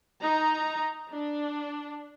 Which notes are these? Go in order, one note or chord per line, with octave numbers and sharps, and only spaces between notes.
D#4 A#5
D4